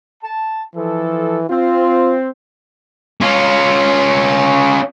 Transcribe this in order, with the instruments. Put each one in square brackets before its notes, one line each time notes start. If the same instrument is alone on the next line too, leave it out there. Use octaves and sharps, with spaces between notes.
[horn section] A5
[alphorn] E3 [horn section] F3 A4
[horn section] C4 [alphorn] F4
[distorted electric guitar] C#4 F4